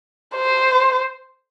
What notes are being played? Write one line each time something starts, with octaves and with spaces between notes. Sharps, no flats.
C5